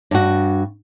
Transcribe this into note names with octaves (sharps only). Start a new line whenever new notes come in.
G2 F#4